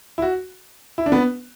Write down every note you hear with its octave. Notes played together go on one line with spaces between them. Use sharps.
E4
F#4
E4
D4
B3